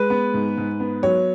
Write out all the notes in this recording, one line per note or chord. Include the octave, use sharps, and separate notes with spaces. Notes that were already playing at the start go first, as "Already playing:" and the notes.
Already playing: G#3 B4
B3
G#2
G#2
B3
F#3 C#5